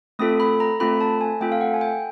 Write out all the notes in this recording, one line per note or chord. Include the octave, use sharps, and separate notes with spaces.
A3 C4 F4 A4 D#6
B5
A#5
A3 C4 F4 A4 B5
A5
G#5
A3 C4 F4 A4 G5
F5
F#5
G#5
G5